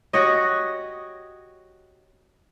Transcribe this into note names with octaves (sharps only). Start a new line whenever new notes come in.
F#4 G4 C#5 D#5